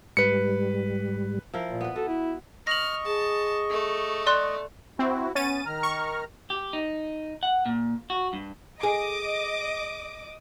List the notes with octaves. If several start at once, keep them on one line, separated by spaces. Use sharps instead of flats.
G#2 G3 B4 C#7
F3 E4 A#4
A#2
B3 B4
F#4 A4
E4
D#5 C#6 F6 A#6 F#7
G#4 A5
A3
D5 C6 F#6
C4 E4 F#4
B3 C#4 A6 D#7
D#3 A#5 F6
C#6
G4
D#4
F#5
A#2
F#4
G2
G#4 D#5 D6 D#6